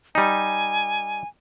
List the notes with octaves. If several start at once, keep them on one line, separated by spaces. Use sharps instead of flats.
G3 D#4 G#5